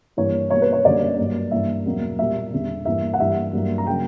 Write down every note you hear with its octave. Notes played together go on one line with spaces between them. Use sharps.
G2 E3 A#3 C#5
B2 G3 A#3 C#5
B4
C#5
F#2 D3 G3 A#3 D5
G2 F#3 A#3
G2 E3 G3 A#3 E5
E2 B2 F#3 A#3
A#2 G3 A#3 E5
E2 D3 G3
G2 E3 A#3 E5
F#5
G2 E3 G3 A#3 E5
G2 F#3 A#3
A#5
C#3 F#3 A#3 G5